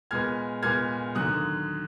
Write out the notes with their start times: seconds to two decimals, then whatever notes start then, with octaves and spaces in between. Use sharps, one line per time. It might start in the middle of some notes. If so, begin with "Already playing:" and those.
0.11 A#2 G#3 B3 F6 G#6
0.62 A#2 G#3 B3 F6 G#6
1.15 D#2 D3 F#3 D#6 F#6